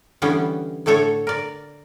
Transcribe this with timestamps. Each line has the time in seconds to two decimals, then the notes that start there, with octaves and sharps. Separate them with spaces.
0.22 D3 E3 G3 B3 C#4
0.86 A2 D3 A3 A4 C#5
1.27 A#4 D5